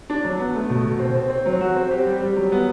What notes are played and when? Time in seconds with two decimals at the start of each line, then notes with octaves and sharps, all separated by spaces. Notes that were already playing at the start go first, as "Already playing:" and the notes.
0.10 D4
0.24 F#3
0.39 B3
0.54 A3
0.70 B2
0.85 B2
0.99 C4
1.15 C4
1.30 C4
1.46 F#3
1.61 F#4
1.76 C4
1.91 G4
2.07 G3
2.21 G3
2.36 F#3
2.52 B3